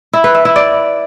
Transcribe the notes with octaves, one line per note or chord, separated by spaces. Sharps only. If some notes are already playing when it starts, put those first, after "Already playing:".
E4
B4
E5
E4
D5